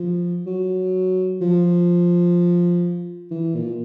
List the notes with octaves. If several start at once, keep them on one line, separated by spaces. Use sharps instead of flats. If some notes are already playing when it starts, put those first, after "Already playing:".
Already playing: F3
F#3
F3
E3
A#2